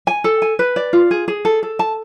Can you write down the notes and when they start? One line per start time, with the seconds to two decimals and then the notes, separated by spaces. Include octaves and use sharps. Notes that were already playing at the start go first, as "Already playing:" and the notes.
0.07 G#5
0.24 A4
0.42 G#5
0.59 B4
0.76 D5
0.93 F4
1.11 G#4
1.28 G#4
1.45 A4
1.63 A4
1.79 A5